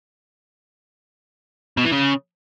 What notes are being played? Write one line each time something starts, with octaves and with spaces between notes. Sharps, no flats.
B2
E3
C#3